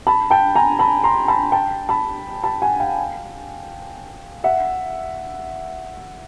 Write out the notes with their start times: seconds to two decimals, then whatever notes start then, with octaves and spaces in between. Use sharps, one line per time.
0.07 A5 B5
0.31 G5 A5
0.55 G#5 A#5
0.79 A5 B5
1.04 A#5 C6
1.28 A5 B5
1.52 G5 A5
1.89 A5 B5
2.44 A5 B5
2.62 F#5 G#5
2.80 F5 G5
4.44 E5 F#5